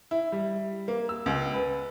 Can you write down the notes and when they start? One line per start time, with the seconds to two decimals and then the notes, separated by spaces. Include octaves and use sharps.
0.11 E4
0.32 G3
0.88 A#3
1.09 E6
1.26 C#2
1.54 B4